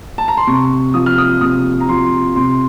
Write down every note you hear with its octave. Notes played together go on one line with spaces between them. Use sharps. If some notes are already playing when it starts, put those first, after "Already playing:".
A5
A#5
C6
C3 C#6
F3 D#6
F6
D#6
C3 D#6
A#5
F3 C6
C3 C6